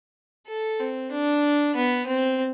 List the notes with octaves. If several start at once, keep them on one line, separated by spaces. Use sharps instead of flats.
A4
C4
D4
B3
C4